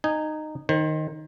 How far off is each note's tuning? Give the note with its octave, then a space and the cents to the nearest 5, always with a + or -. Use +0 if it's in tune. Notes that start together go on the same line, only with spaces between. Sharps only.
D#4 -15 G#5 +0
D#3 +0 C5 +30